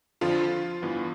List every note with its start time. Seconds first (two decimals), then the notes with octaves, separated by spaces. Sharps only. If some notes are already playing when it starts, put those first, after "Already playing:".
0.21 F2 D3 F3 F4
0.82 G2 E3 B3